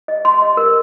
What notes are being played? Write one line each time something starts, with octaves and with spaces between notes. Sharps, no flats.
D#5
C6
D#5
A#4